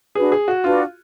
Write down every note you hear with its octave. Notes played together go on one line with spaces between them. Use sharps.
D4 F#4 G#4 B4
G#4
F#4
D4 F4 F#4 B4